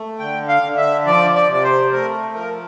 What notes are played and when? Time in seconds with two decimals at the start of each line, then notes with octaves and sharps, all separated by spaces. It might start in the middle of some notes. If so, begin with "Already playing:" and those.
Already playing: A3
0.19 D3 G5
0.48 F5
0.62 D3
0.77 E5
1.06 F3 D5
1.35 D5
1.48 C3 D5
1.64 C5
1.91 A3 A#4
2.35 F3 A#4